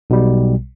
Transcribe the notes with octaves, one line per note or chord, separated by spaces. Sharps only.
B1 B2 G3